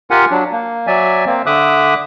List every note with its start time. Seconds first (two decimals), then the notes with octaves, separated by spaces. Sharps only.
0.11 F4 G4 A#4 F#5 G#5
0.31 F#3 D4
0.52 A#3
0.87 F#3 D5 E5 G#5
1.26 A#3 C4
1.46 D3 E5 D6 D#6 F#6